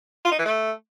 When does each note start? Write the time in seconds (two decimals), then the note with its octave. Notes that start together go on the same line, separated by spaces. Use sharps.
0.25 F4
0.32 D#4
0.39 E3
0.45 A3